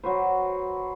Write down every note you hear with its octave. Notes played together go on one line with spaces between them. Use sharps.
F#3 F#4 B4 C5